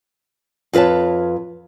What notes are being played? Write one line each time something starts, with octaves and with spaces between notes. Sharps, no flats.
F2 F4 B4 C#5 A5